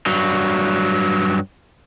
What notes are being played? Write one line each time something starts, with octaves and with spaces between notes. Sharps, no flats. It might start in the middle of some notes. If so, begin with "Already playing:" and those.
G2 F#3